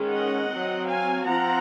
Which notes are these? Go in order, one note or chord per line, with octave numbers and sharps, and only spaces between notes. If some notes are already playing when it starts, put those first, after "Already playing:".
Already playing: D#3 G#3 C#4
D#5 F#5
C4
F#3
F5 G#5
F3 C4 F#5 A#5